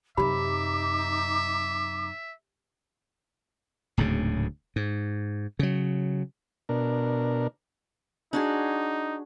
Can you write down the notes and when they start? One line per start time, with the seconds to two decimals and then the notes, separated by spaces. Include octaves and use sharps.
0.17 F#2 C3 D#4 G4 E5 B5 D6
3.97 D1 D2 G#2 C#3
4.76 G#2
5.59 C#3 F#3
6.69 B2 D4 A#4
8.33 D4 D#4 F#4 G#4